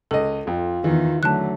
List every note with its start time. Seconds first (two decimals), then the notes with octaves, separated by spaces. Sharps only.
0.11 C#2 A4 D#5
0.47 F2 F4
0.84 E2 D#3 E3
1.23 D3 F#3 A3 A5 F#6